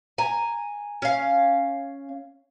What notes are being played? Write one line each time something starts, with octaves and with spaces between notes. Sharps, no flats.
G#5 A#5
C#4 F5